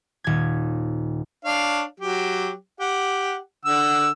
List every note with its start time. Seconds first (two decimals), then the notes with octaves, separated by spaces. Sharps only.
0.24 D#1 G#6
1.45 D4 C#5 F5
2.00 F#3 G4
2.80 G4 F#5
3.65 D3 F#5 E6